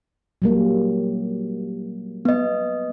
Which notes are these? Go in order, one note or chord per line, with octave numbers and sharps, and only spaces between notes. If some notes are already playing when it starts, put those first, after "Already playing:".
F#3 G3 A#3
B3 D#5